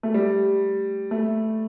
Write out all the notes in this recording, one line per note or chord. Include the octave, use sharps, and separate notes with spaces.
A3
G3
A3